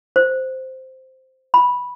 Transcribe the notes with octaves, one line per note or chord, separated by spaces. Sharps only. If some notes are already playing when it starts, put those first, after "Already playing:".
C5
B5